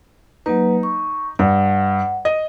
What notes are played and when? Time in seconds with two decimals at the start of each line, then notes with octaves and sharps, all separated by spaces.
0.46 F#3 A#3 D#4 B4
0.83 C#6
1.39 G2 F#5
2.25 D#5